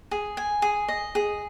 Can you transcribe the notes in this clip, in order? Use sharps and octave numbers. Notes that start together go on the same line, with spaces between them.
G#4
G#5
G#4
D#5
G#4